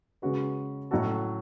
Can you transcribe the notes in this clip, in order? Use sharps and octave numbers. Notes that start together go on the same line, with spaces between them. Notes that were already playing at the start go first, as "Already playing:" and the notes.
C#3 G#3 C#4 F#4 B4
A2 F#3 C#4 F#4 A4